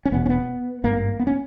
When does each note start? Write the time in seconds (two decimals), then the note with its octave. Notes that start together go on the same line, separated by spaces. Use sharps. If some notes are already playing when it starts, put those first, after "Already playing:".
0.05 C#4
0.12 E1 E2 B2 B3
0.25 C#4
0.29 B3
0.84 G#1 G2 A#3
1.19 B3
1.27 C#4